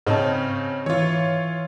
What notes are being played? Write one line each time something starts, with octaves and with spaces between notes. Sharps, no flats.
G#2 C#3 C4 C#4 D#5 A5
E3 F4 C#5